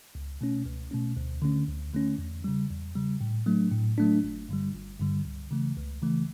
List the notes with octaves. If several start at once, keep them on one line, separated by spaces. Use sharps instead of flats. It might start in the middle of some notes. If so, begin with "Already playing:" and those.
C#2
B2 A3 C#4
C#2
B2 A3 C#4
D2
D3 A3 C#4
D2
D3 A3 C#4
E2
C#3 G3
E2
C#3 G3
A2
F#3 A3 D4
A2
F#3 A3 D4
G1
G2 D3 G3
G1
G2 D3 G3
C#2
C#3 E3 A3
C#2
C#3 E3 A3